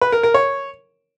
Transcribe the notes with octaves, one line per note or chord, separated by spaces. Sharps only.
B4
A#4
A#4
C#5